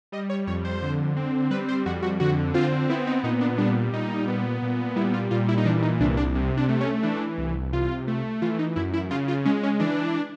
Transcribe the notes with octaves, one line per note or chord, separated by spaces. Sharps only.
G3 D#5
C#5
F2 C#5
C5
D3
C4
G3 B4
C5
F2 F#4
F#4
D3 F#4
C4 F4
B3 E4
D#4
A#2 D#4
D4
G3 D4
A#2 D#4
B3
A#2
G3 E4
F4
A#2 F4
E4
D#4
E3 D4
D#4
C2 D4
D4
C3
D4
A3
C#4
E3 D4
C2
C3 F4
A3
E3 F4
D#4
F#2 E4
E4
C#3 F4
F4
G#3 C#4
C#4
E3 D4